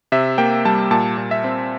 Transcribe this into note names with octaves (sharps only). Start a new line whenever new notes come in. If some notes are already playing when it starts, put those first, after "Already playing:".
C3 E5
A#3 G5
G3 A5
A#2 A5
A#2
E5
C4